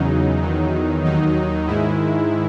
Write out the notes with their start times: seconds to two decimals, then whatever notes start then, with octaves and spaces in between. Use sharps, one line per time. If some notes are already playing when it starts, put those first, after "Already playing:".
Already playing: E2 C#3 F#3 D#4
0.42 E2 D#3 F#3
1.04 D#2 D#3 F#3 D#4
1.67 G#2 D#3 G#3 E4